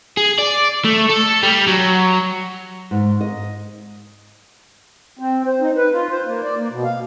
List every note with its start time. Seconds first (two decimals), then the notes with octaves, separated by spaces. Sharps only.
0.17 G#4
0.39 D5
0.85 A3
1.09 A4
1.43 G3
1.68 F#3
2.91 G#2
3.21 D#5
5.19 C4
5.46 C5
5.61 D#4
5.76 B4
5.92 F4
6.10 C5
6.26 A#3
6.43 D5
6.57 A#3
6.71 B2
6.84 F5